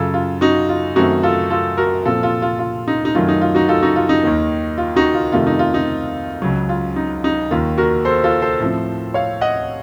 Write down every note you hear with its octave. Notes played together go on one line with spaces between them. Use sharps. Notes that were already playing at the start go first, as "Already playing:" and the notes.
Already playing: F#2 C#3 F#3 F4 A4
F4
D#4 F#4
F4
F#2 D#3 A3 C4 D#4 F#4
F4 A4
F4 A4
F#4 A#4
A#2 F3 C4 F4 A4
F4 A4
F4
F4
D#4
D#4
F#2 D#3 F#3 A3 F4
D#4
F4
D#4 F#4
F4 A4
D#4 F#4
F4
D#4
D#2 D#3 A#3
F4
D#4 F#4
F4
F2 C3 D#3 A3 F4
D#4
F4
D#4
C#2 C#3 F#3
F4
D#4
D#4
D#2 D#3 A#3 F4
F#4 A#4
A4 C5
F4 A4
A4 C5
A2 F3 C4
C#5 F5
D#5 F#5